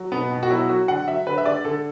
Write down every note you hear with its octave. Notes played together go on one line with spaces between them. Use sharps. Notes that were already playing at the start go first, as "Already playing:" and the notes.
Already playing: F#3
B2 B3
B2
F#4
F#3 E4
F#3 F#4
D3 F#5
F#3 E5
D3 B4
E5
D3 D5
D3 A4